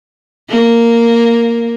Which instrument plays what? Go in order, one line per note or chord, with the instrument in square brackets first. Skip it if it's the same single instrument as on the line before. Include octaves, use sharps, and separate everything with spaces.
[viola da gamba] A#3